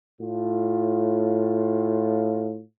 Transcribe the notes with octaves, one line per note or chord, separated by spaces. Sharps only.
A2 F4